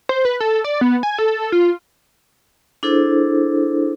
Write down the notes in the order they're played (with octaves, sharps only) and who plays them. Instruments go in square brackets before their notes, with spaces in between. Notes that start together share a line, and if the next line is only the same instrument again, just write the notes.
[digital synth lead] C5
B4
A4
D5
B3
G#5
A4
F4
[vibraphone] D4 E4 G#4 A4 C5